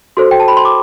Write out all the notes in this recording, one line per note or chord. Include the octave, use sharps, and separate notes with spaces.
F#4 A4 C5 C6
G5
A5
B5
C6
D6